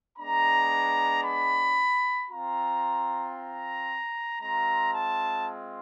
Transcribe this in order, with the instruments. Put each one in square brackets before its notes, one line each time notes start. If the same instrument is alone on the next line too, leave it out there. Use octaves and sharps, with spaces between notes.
[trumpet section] G#3 B3 D4 A#5
B5
C4 F4 A#5
A#5
G#3 C4 F4 A#5
A5